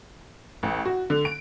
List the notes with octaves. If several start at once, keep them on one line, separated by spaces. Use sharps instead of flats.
A1
F#4
D3
D7